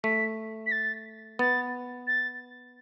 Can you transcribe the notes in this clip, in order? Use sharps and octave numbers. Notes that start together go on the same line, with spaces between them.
A3 B6
B6
A6
B3 A6
A6